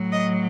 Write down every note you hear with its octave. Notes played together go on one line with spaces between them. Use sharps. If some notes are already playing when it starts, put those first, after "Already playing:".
Already playing: A2 F#3
D#5